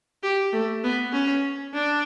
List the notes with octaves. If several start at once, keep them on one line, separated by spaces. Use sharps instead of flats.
G4
A3
B3
C#4
D4